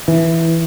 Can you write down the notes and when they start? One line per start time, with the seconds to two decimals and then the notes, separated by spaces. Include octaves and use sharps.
0.08 E3